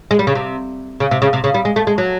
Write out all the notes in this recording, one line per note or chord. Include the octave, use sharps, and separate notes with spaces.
G#3
G3
C#3
C3
C#3
C3
C#3
C3
C#3
G3
G#3
A3
G#3
F#3